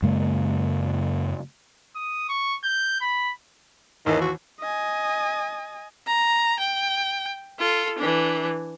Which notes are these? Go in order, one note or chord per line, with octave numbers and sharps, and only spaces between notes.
F#2 C#3 G#3 A#3
D#6
C#6
G6
B5
D#2 D#3 E3
F#4
D#5 G#5
A#5
G5
F4 A4
E3 D4